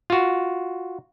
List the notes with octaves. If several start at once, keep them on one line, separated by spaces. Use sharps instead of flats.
F4 F#4